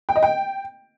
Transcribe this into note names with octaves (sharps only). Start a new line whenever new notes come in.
G5
D#5
G5